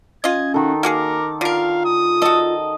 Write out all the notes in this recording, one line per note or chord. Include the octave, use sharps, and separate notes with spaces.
C#4 F4 D#5 G#6
D#3 F#4 A4
A#3 F#4 G#4 A#4 D6
D3 F4 A#4 F5
D#6
F#4 A4 D#5